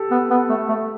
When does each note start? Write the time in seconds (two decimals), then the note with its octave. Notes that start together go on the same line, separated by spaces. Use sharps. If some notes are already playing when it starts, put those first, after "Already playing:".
Already playing: G4 A4
0.11 B3
0.30 B3
0.49 A3
0.69 A3